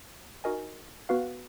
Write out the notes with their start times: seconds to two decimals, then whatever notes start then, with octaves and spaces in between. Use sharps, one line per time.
0.44 D#4 F#4 A#4 D#5 G#5
1.09 B3 F#4 B4 F5